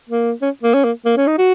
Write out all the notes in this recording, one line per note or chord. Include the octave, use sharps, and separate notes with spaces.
A#3
C#4
A#3
C#4
A#3
A#3
C#4
D#4
F#4